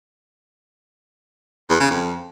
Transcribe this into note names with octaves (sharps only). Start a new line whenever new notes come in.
E2
C#3
F2